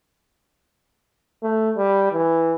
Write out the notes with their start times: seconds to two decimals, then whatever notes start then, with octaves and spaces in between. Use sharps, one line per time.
1.43 A3
1.77 G3
2.12 E3